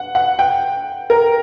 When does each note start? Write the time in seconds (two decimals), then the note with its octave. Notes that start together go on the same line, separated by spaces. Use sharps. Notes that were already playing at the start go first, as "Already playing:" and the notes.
Already playing: F#5
0.15 F#5
0.39 G5
1.10 A#4